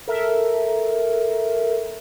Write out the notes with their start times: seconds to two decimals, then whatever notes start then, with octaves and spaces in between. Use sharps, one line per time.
0.08 A4 A#4 E5